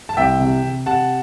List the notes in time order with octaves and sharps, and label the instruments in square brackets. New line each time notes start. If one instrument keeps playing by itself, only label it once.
[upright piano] A5
[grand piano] C2 [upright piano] E5 G5
[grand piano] C3
C3
[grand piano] C3 [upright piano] F#5 A5